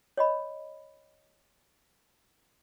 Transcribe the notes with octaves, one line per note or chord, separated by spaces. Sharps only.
C#5 D#5 B5